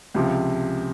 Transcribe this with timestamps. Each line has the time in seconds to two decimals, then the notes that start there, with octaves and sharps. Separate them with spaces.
0.14 C#2 C3 F3